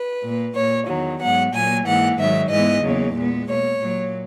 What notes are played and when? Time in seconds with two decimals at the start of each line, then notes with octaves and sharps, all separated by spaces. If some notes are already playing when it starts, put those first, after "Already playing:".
Already playing: B4
0.23 A#2 A#3
0.55 A#2 A#3 C#5
0.87 E2 D#3 F#3
1.20 G#2 F#3 B3 F#5
1.53 A#2 F#3 A#3 G#5
1.85 G#2 E3 A#3 F#5
2.17 G#2 D#3 F#3 E5
2.50 G#2 E3 G#3 B3 D#5
2.83 E2 C#3 F#3 A#3
3.16 A#2 G#3 B3
3.48 B2 A#3 C#5
3.80 A#2 F#3 A#3